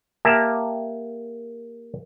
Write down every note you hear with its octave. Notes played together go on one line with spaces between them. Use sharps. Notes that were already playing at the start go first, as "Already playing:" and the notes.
A#3 G4 E5 F5 A5